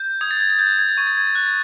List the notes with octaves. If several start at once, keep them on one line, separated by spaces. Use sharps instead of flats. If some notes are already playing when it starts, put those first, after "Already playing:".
Already playing: G6
D#6 G#6
A6
G#6
A6
G6 G#6
A6
G#6
A6
C#6 G#6
A6
G#6
A6
F#6 G#6
A6